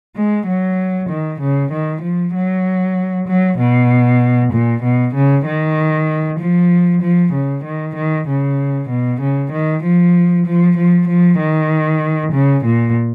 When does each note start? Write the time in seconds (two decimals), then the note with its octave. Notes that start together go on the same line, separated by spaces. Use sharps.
0.14 G#3
0.45 F#3
1.08 D#3
1.40 C#3
1.70 D#3
2.01 F3
2.33 F#3
3.26 F#3
3.57 B2
4.52 A#2
4.82 B2
5.13 C#3
5.45 D#3
6.38 F3
7.01 F3
7.33 C#3
7.63 D#3
7.94 D#3
8.26 C#3
8.88 B2
9.19 C#3
9.51 D#3
9.82 F3
10.45 F3
10.75 F3
11.07 F3
11.38 D#3
12.31 C#3
12.63 A#2